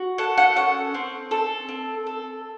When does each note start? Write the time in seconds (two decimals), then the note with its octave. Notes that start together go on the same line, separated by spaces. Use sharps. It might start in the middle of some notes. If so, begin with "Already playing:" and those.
Already playing: F#4
0.18 A4 F#5
0.38 F#5
0.56 C#4 F#5
0.94 C4
1.31 A4
1.68 C4
2.07 A4